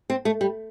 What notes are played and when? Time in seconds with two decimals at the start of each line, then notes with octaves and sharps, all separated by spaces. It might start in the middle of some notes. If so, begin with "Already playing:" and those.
0.10 C4
0.25 A3
0.41 G3